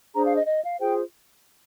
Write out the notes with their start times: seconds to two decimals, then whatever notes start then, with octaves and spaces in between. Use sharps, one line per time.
0.15 D4 G#4 C5 A#5
0.26 F5
0.37 D#5
0.47 D#5
0.64 F5
0.80 F4 G#4 C5 G5